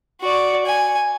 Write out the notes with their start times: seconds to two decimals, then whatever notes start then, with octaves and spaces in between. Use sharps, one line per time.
0.21 F#4 D5
0.66 G#5